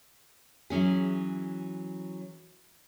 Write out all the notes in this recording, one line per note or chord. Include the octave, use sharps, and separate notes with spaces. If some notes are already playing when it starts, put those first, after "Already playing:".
E3 F#3 C#4 G#4